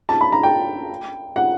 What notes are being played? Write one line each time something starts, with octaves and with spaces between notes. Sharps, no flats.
A5
B5
A#5
G5
F#5